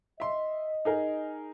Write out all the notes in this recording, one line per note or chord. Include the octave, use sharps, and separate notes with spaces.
D#5 E5 C6
D#4 G#4 A#4